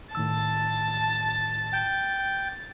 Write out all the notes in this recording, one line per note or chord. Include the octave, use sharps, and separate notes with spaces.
A2 D#3 A5 E6 A6
G5